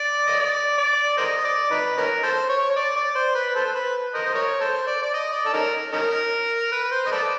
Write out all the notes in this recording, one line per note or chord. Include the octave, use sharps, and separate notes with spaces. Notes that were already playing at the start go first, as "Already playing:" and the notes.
Already playing: D5
D#5
D5
D5
A#4 C5 D#5
D5
D#4 B4
C#4 D#4 A#4
A4 C5
C#5
C#5
D5
D5
C5
B4
A4 C5
B4
A#4 C5 D#5
C5
A#4 C#5
A4 C5
D5
D5
D#5
D5
A4
C#4 D#4 A#4
C#4 D#4 A#4
B4
B4
C5
D#5
A4 B4 D5